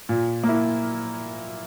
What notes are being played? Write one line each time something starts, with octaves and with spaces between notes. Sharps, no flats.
A#2
A#3 E4